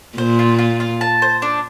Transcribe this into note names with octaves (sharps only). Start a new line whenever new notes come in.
A#2 C5
F4
F4
F4
A5
C5
D4